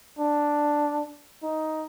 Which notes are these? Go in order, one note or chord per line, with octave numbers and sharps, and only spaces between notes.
D4
D#4